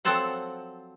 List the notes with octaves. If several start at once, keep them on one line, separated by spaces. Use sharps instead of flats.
F3 F#3 C4 A4 C5 F#5